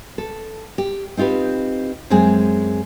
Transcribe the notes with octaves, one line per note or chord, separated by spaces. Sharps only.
A4
G4
C4 D#4 F4 G4 B4
F#2 G#3 C4 G#4 G#5